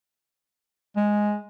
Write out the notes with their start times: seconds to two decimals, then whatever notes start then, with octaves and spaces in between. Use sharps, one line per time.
0.96 G#3